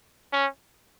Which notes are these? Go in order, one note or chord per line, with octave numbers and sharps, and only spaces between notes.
C#4